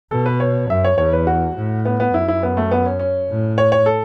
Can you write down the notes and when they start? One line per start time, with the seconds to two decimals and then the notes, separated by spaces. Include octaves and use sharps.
0.11 B2 A4
0.26 B4
0.40 C#5
0.70 F#2 E5
0.85 C#5
0.98 E2 C#5
1.13 B4
1.27 F#4
1.56 A2
1.85 B3
2.00 B3
2.13 F#2 E4
2.28 E4
2.43 B3
2.57 A3
2.71 B3
2.86 C#4
3.00 C#4
3.30 A2
3.58 C#5
3.72 C#5
3.86 A4